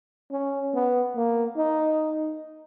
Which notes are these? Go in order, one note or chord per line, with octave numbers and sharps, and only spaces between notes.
C#4
B3
A#3
D#4